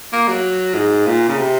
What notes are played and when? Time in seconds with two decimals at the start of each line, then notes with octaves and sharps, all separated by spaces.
0.13 A#3
0.28 F#3
0.75 G#2
1.07 A#2
1.29 C#3
1.38 C3